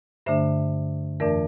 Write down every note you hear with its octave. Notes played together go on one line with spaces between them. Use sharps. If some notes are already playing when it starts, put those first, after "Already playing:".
G2 D3 A3 D4 C5 E5
F2 E3 A3 D4 A#4 D5